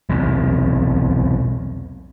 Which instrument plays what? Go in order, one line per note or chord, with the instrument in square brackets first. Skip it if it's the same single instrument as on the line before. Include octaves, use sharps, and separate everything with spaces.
[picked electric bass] B1 E2 C3